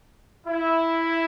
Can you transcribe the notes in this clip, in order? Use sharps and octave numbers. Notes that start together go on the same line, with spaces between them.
E4